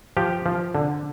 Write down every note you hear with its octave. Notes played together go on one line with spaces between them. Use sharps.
F3 G4
F3
D3